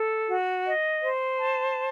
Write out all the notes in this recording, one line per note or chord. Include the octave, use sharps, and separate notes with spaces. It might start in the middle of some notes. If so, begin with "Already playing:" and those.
Already playing: A4
F#4
D#5
C5
A5